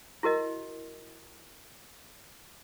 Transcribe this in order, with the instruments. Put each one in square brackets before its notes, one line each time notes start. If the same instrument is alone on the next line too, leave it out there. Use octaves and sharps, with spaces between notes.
[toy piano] E4 F#4 A#4 D#5